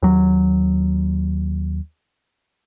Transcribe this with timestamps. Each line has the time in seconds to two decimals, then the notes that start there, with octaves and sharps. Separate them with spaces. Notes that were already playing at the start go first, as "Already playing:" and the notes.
0.03 D#2 F#3